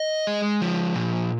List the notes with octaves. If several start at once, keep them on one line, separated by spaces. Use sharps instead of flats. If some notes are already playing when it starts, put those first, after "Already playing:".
Already playing: D#5
G#3
F3
A#2